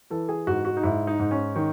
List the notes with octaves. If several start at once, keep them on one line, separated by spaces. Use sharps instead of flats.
E3 A4
G#4
G#2 F#4
F#4
D#4
G#2 E4
D#4
G#2
C#4
D#3